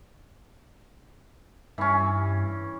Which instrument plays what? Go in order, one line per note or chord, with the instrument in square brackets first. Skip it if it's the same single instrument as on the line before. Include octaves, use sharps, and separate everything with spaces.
[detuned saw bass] G2 [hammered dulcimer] E3 C#4